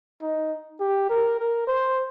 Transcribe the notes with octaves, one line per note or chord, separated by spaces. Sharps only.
D#4
G4
A#4
A#4
C5